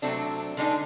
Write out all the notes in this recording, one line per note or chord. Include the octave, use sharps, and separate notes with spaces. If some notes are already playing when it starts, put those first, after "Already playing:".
C3 F#3 A3 C4 D4
D3 G#3 D4 D#4